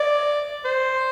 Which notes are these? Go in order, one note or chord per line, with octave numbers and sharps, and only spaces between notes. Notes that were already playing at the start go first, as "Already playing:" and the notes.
Already playing: D5
C5